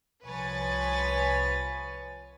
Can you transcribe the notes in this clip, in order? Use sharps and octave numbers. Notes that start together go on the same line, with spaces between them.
C2 F3 B4 C#5 G#5 A6